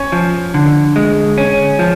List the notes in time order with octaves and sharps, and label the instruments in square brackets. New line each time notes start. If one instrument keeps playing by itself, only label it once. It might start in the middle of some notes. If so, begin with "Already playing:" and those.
Already playing: [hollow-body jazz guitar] C#4 [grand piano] C#5
[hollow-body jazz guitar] F3
D3
G#3
C#4
F3